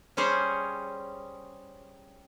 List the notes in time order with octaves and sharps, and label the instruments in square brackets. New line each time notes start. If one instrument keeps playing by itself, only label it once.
[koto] G3 C#4 G#4 C5 C#5